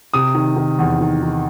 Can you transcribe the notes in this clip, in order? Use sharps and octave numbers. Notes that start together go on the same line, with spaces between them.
C3 D#6
D#3
D#3
E2
D#3
D#3